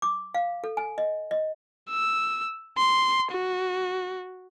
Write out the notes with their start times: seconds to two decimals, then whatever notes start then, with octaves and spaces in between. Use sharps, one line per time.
0.02 D6
0.34 F5
0.64 A4
0.77 G#5
0.98 D#5
1.31 D#5
1.90 E6
2.78 C6
3.31 F#4